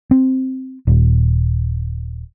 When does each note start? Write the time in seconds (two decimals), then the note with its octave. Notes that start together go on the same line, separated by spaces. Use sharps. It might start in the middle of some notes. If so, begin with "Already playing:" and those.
0.11 C4
0.87 D#1